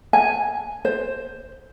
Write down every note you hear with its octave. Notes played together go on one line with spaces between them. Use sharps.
G#5
C5